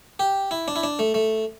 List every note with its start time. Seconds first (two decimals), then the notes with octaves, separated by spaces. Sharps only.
0.19 G4
0.51 E4
0.68 D4
0.76 E4
0.83 D4
0.99 A3
1.14 A3